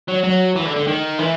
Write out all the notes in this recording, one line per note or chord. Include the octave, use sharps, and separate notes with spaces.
F#3
F#3
E3
D3
D3
D#3
E3